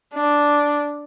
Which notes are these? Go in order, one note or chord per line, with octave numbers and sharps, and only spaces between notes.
D4